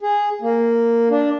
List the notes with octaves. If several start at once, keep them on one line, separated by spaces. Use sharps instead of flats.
G#4
A#3
D4